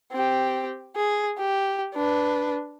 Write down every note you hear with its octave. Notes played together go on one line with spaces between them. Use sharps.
C4 G4
G#4
G4
D4 B4